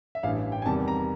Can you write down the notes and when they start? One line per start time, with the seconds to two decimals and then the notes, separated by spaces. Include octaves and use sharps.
0.15 E5
0.23 A1 G2 E3 F5
0.52 G5
0.62 G#5
0.66 E2 C3 D#3 G3 A5
0.88 A#5